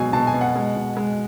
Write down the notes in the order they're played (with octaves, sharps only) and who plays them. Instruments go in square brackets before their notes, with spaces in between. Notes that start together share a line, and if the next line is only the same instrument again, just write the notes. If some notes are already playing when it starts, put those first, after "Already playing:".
Already playing: [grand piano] B2 F#3 G#3 G#5
B2 A5
G#5
B2
F#5
G#3
B2
G#3